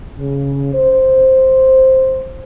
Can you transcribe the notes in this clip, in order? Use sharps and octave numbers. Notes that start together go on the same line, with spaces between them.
C#3
C5